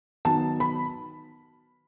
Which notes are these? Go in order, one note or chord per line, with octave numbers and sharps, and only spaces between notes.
D#3 F#3 B3 A5
B5